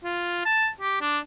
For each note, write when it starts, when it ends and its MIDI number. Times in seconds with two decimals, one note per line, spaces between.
0.04 0.45 65
0.46 0.68 81
0.81 1.01 67
1.01 1.19 62